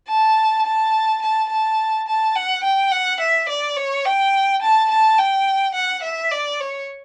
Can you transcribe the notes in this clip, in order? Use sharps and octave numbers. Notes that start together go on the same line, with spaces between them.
A5
A5
A5
A5
A5
F#5
G5
F#5
E5
D5
C#5
G5
A5
A5
G5
F#5
E5
D5
C#5